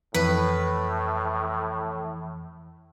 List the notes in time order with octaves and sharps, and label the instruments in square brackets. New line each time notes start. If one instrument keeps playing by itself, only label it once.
[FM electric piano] F2 E3 [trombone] A2 [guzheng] B4